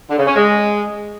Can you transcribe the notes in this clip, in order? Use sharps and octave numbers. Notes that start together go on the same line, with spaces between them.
D3
C#3
C#4
G#3